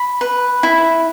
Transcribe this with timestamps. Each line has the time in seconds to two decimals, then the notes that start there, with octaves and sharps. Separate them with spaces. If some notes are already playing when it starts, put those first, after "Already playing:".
Already playing: B5
0.21 B4
0.63 E4